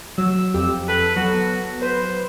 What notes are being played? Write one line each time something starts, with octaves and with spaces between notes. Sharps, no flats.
F#3 E6
F2 G4
A4 B4
F#3 B3 F#4
B4 C5